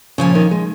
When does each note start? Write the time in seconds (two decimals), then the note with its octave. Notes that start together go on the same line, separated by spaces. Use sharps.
0.18 A#2 C#3 F3 C#4
0.35 D#3
0.51 G#3